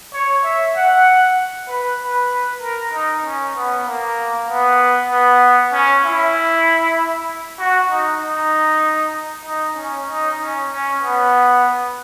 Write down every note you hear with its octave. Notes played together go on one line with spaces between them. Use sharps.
C#5
E5
F#5
B4
B4
A#4
D#4
C#4
B3
A#3
B3
B3
C#4
E4
F#4
D#4
D#4
D#4
C#4
D#4
C#4
C#4
B3